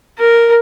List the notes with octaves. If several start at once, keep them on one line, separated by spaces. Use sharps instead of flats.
A#4